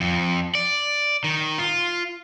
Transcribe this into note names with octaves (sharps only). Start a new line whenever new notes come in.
F2
D5
D#3
F4